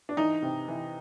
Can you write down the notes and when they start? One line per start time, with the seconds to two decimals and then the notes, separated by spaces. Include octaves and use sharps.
0.09 D4
0.17 E3 D#4
0.42 C3
0.68 E3